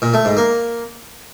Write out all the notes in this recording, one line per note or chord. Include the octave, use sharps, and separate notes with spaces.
A#2
A3
G#2
A#3